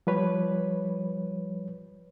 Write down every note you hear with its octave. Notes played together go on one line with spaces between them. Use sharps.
F3 G3 B4 C#5